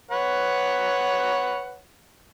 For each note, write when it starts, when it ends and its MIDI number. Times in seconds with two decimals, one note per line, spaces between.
0.11 1.79 71
0.11 1.79 73
0.11 1.79 78